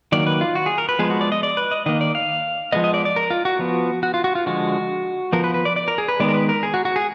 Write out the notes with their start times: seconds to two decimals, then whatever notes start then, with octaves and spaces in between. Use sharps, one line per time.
0.12 D#3 F#3 A#3 D5
0.27 B4
0.41 F4
0.55 F#4
0.66 G#4
0.78 A#4
0.89 B4
0.99 F3 G#3 B3 G#4
1.10 F#4
1.21 D5
1.32 D#5
1.43 D5
1.57 B4
1.71 D#5
1.86 D#3 A#3 D#5
2.01 D5
2.15 F5
2.72 F3 G#3 B3 D#5
2.84 D#5
2.94 D5
3.05 D5
3.16 A#4
3.30 F4
3.45 F#4
3.59 F3 B3
4.03 F#4
4.14 F4
4.24 F#4
4.35 F4
4.46 D3 F3 G#3 F#4
5.33 F3 B3 A#4
5.44 B4
5.54 B4
5.65 D5
5.76 D5
5.88 A#4
5.98 G#4
6.08 B4
6.20 D#3 G#3 B3 D5
6.29 A#4
6.34 B4
6.49 A#4
6.63 G#4
6.74 F#4
6.85 F#4
6.96 G#4